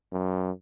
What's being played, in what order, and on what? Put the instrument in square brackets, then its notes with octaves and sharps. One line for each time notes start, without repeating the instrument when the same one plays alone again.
[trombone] F#2